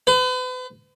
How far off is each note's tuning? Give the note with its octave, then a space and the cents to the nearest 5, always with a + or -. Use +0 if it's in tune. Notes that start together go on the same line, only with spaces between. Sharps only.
B4 +40